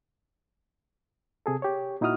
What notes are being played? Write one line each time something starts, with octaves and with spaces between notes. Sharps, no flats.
C3 G#4 A4
G4 C#5
A#2 D#4 E4 F#4 D#6 F6